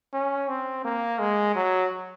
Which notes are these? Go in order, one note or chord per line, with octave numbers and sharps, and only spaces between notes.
C#4
C4
A#3
G#3
F#3